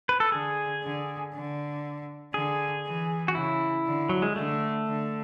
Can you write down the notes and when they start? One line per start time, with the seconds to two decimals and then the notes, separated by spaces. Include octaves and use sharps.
0.09 B4
0.20 A4
0.32 D3 G#4
0.83 D3
1.33 D3
2.34 D3 G#4
2.85 E3
3.28 F#4
3.35 C#3 E4
3.86 D3
4.09 F#3
4.22 G#3
4.36 D3 A3
4.87 D3